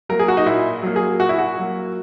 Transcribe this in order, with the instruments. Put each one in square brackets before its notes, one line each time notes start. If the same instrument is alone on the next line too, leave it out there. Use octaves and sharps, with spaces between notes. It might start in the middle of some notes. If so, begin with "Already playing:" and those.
[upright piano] F#3 A#3 A#4
G#4
F#4
D#4
A#2 E4
F#3 A#3
G#4
A#2 F#4
E4
F#4
F#3 A#3